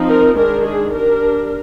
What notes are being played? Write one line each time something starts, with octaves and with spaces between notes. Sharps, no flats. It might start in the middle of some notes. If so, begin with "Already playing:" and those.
Already playing: F3 C4 D#4
A#4
D#3 G#3 D4 A#4
G#4
G3 D4 A#4